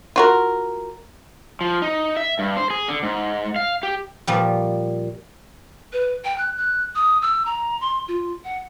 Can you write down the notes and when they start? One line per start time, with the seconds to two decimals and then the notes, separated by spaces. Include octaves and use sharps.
0.16 F4 F#4 A#4
1.61 F3
1.82 D#4
2.17 E5
2.39 G2
2.57 C5
2.70 G#4
2.88 D3
3.03 G#2
3.56 F5
3.83 G4
4.27 A#2 F3 G3
5.93 B4
6.25 G5
6.38 F#6
6.58 F#6
6.95 D#6
7.22 E6
7.46 A#5
7.81 C6
8.08 F4
8.44 F#5